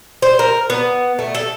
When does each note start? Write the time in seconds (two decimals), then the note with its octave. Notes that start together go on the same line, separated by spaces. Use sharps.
0.22 C5
0.39 A#4
0.70 B3
1.19 A3
1.35 A4